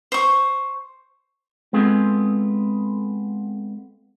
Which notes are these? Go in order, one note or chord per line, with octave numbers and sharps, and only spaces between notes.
C5 C#6
G#3 B3 C4 F4 G#4 A4